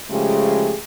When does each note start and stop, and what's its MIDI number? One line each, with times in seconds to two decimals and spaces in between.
0.10 0.74 49
0.10 0.74 53
0.10 0.74 56
0.10 0.74 57
0.10 0.74 67
0.10 0.74 68